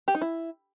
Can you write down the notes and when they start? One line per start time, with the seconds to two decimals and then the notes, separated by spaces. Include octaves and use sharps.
0.08 G4
0.15 D#4
0.21 E4